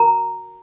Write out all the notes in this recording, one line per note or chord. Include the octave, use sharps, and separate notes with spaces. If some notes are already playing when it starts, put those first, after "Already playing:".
Already playing: F#4 A#4 A#5